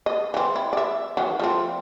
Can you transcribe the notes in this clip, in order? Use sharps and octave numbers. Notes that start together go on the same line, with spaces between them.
D#5
E3 C4
E4
D5 E5
D#3 E3 F#3
F3 A3 C4